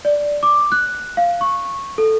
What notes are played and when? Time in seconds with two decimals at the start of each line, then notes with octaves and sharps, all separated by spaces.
0.05 D5
0.43 D6
0.72 F#6
1.17 F5
1.41 C#6
1.98 A4